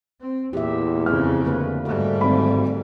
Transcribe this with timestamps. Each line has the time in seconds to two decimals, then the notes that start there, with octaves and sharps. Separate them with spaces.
0.21 C4
0.53 E2 A#2 G4 E5
1.06 F2 C#3 A3 F6
1.45 D3 A#3 B4
1.85 G#2 G3 A3 F#4
2.21 G#1 B5